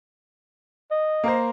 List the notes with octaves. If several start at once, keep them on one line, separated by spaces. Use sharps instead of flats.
D#5
A#3 A#4 C5